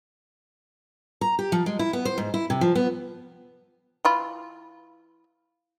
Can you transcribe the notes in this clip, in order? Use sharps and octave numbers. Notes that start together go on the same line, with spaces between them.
A#5
G4
F3
G#3
E4
B3
C5
G#2
E4
C3
F3
B3
E3 F4 B5